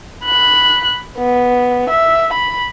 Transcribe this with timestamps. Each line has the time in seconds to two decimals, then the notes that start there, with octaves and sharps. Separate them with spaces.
0.24 B5 F#6
1.17 B3
1.90 E5
2.33 B5